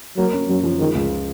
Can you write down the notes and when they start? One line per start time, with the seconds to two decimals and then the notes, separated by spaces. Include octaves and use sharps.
0.17 F#3 A#3
0.33 C#4
0.48 F#2 F#3
0.63 F3
0.79 D#3 G#3
0.95 C#2